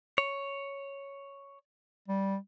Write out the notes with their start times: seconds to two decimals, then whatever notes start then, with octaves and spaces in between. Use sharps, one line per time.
0.18 C#5
2.08 G3